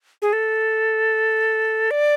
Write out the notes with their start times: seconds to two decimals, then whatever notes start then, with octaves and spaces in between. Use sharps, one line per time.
0.22 G#4
0.33 A4
1.91 D5